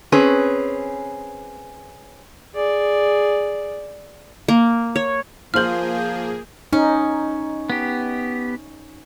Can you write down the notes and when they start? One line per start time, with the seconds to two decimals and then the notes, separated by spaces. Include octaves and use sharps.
0.12 C4 C#4 G#4 B4
2.54 G#4 D5
4.48 A#3
4.96 C#5
5.54 F3 A#3 F4 G#4 C5 F6 G6 F#7
6.73 C#4 D#4
7.70 B3 G4